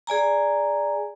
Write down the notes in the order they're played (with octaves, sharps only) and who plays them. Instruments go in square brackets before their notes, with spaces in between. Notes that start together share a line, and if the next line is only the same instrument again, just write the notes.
[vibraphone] G#4 D5 G#5 A#5